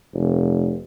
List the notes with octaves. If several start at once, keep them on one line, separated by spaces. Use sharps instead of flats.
F1